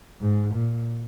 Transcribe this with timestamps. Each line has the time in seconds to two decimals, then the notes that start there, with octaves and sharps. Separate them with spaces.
0.21 G#2
0.54 A#2